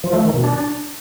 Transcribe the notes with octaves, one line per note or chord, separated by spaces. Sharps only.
F3
A3
D#3
B2
D4